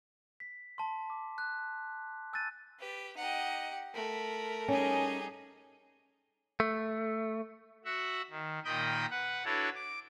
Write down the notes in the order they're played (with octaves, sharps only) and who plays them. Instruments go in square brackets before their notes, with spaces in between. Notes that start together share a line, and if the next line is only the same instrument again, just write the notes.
[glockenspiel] B6
A5 C6
D6
F#6
G#5 E6 F#6 G6 A6 D#7
[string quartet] G4 B4
[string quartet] D#4 D#5 [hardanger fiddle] G4 F#5
[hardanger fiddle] A3 A#4 [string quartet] B5
[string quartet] G3 D#4 G#4 [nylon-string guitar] C#4
[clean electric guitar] A3
[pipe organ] F#4 E5 F#5
D#3
A#2 D#3 D#5 G5 B5 D#6
B4 F#5
D4 E4 F#4 A4 B4 C#5
D6